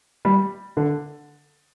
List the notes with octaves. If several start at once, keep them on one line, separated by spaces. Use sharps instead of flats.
G3
D3